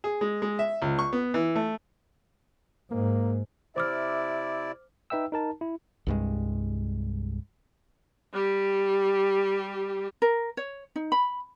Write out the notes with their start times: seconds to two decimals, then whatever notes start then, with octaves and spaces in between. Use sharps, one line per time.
0.04 G#4
0.21 G#3
0.42 G#3
0.59 E5
0.82 C#2
0.99 C#6
1.13 B3
1.34 E3
1.56 A3
2.91 G#2 A#3
3.76 C3 E4 C5 D5 E5 D6 F6
5.10 D#4 B4 E5 G5 E6
5.32 D#4 A#4 A5
5.61 E4
6.07 C2 G2 G#3
8.33 G3 G4
10.22 A#4
10.57 C#5
10.96 D#4
11.12 B5